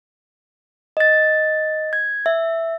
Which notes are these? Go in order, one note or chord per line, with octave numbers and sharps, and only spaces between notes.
D#5 A6
G#6
E5